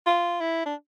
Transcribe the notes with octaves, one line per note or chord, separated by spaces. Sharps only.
F4
E4
D4